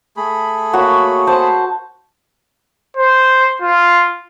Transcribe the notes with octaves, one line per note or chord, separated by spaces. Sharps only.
A3 G#4 B5
A#3 F#4 C#5
C5 A5
C5
F4